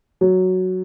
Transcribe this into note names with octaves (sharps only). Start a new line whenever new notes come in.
F#3